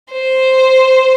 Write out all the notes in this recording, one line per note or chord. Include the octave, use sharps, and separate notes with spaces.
C5